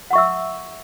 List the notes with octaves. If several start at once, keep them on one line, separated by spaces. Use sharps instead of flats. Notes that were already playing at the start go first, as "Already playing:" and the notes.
E5 F#5 C#6 E6